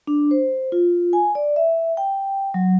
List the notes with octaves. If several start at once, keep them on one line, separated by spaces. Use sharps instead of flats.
D4
C5
F4
G#5
D5
E5
G5
F#3